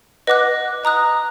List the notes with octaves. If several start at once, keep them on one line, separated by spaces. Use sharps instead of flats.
B4 D#5 F#5 D6 F#6
D#5 A#5 D#6 F#6